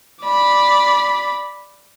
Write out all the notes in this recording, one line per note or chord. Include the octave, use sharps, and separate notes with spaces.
D5 B5